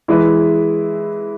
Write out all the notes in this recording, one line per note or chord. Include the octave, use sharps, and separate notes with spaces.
E3 G#3 E4 B4